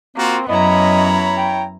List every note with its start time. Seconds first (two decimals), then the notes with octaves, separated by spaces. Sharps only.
0.17 A#3 C4 F4 F#4
0.48 F#2 B3 C#4 E4 C#5 D#5 A#5 B5
1.37 G5